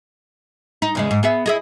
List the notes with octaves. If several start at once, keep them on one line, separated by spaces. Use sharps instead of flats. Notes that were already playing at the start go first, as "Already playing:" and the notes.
D#4
E2 C#3 G#3
G#2
B3 G#4 E5
E4 G#4 D#5